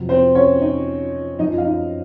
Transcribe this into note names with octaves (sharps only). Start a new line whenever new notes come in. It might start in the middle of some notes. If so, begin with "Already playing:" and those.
Already playing: F2 C3 F#3
C4 C5
C#4 C#5
D#4 D#5
F#2 F3 D#4 D#5
F5
D#4 D#5